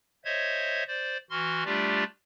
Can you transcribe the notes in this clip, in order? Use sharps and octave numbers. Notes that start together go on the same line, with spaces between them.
C5 C#5 D#5 E5 G#6
C5 D5
E3 F#4 C6 F6
G3 A3 D4 F4 G4 D5